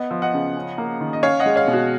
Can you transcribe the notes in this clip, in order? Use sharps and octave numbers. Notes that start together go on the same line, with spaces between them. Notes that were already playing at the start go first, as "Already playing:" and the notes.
Already playing: B3 D#5 F#5
F3
D#5 F#5
C#3
C#4
A#3
D#3
D#5
C#4 C#5 F5
D#5 F#5
G#3
C#5 F5
B2
F#4